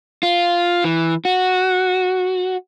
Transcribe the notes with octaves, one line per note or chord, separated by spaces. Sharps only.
F4
E3
F#4